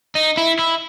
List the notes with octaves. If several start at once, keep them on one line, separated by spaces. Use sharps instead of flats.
D#4
E4
E4